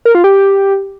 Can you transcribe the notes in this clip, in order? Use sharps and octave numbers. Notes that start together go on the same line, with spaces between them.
A#4
F4
G4